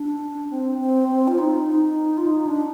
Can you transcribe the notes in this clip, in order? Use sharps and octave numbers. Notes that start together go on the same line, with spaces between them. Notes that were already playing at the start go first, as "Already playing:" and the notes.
Already playing: D4
C4
C4
C4
F4
D#4
D#4
F4
D#4
D4